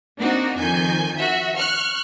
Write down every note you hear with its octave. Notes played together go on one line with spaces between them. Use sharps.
A#3 C4 D4 D#4 F#4
F2 D#3 G#5 G6
F#4 E5
C#6 F6 F#6